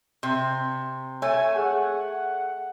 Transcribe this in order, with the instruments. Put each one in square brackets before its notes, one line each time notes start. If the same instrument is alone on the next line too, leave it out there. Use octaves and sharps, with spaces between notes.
[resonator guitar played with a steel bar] C3
[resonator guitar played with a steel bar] A3 [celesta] C#5 [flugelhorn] G#5
[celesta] G#4 [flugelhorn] F#5